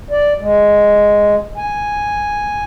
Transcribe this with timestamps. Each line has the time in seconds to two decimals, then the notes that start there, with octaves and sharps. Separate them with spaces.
0.11 D5
0.40 G#3
1.57 G#5